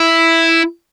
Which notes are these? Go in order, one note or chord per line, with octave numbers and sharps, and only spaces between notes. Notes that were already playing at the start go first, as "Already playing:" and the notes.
Already playing: E4